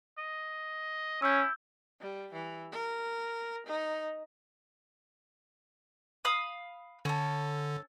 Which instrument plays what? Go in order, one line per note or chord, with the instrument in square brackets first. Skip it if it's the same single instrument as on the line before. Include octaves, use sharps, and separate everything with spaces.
[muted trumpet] D#5
[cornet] C#4 [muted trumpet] E4 [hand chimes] E6 G6
[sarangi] G3
E3
A#4
D#4
[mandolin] F5 B5 D#6
[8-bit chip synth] D3 [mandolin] C#4 A4